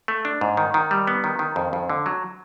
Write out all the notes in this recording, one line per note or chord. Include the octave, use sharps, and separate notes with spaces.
A3
D4
G#2
D#3
D#3
G3
B3
D#3
D#3
F2
F2
D3
F#3